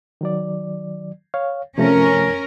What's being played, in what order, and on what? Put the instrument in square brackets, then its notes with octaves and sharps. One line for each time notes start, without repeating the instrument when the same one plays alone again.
[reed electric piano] D#3 F#3 D5
C#5 F5
[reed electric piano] C3 F3 A3 [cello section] C#4 A#4